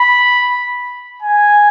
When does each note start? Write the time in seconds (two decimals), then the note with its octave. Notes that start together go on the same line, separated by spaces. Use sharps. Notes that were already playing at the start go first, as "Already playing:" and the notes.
Already playing: B5
1.23 G#5